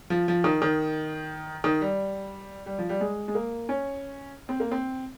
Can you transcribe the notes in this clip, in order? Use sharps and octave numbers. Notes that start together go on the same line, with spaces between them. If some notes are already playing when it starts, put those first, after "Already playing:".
F3
F3
D#3
D#3
D#3
G3
G3
F3
G3
G#3
G#3
A#3
C#4
C4
A#3
C4